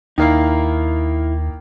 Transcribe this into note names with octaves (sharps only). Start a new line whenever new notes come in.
D#2 D#3 A#3 D#4 E4 F5